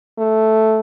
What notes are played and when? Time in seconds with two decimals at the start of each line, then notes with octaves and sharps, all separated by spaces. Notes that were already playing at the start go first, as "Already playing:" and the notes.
0.18 A3